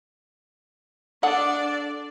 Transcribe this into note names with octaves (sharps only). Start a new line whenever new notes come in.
D4 G#4 A4 D5 F#5